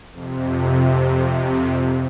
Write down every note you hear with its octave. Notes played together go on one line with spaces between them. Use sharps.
F2 C3